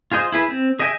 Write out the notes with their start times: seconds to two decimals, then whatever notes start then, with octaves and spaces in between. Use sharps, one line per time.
0.12 F4 G#4 C5 D#5
0.32 E4 G#4 B4
0.48 C4
0.79 G#4 D#5 E5 G5 G#5